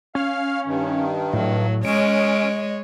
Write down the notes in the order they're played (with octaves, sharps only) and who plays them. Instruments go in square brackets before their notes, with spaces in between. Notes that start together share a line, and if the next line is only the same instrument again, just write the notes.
[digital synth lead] C#4 [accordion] F5 F6
[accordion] G2 D#3
[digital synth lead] A2 [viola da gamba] F#3
[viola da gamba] G#3 C#5 [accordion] C#4 [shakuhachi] D#5 [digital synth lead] D7